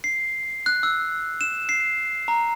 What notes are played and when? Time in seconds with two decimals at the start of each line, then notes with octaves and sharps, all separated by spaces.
0.04 C7
0.66 F#6
0.83 E6
1.41 E7
1.69 C7
2.28 A#5